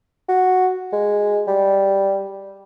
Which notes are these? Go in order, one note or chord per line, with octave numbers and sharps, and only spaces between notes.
F#4
G#3
G3